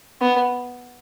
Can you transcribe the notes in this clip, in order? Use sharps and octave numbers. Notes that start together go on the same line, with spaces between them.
B3